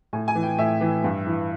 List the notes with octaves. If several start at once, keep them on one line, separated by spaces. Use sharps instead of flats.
A2 G#5
G#5
E3
G5
A2 E5
E3
G2
E3